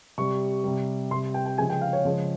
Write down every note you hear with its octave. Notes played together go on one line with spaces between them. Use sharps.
C3 G3 C#6
C3 G3
C3 G3 C6
G5
G5
C#3 F3 G#3 G#5
G5
F5
C#5
C#3 F3 G#3